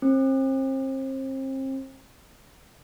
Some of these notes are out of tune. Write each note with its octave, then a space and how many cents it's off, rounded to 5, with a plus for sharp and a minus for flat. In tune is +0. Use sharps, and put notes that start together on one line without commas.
C4 +35